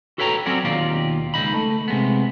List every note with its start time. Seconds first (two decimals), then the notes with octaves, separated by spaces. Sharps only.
0.18 F#4 A4 B4 C#5 G5 A#5
0.46 F#3 C4 C#4 F#4 D5
0.65 D#2 B2 D#4 F4 G4 D5
1.34 C#2 G2 D#4 B5
1.54 A3
1.88 C3 G#3 B3